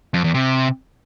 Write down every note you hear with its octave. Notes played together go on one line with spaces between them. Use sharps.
F2
E2
C3